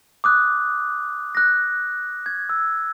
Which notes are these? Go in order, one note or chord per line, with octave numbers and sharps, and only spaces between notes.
D6 D#6 F#6
F#6 A#6
G#6
E6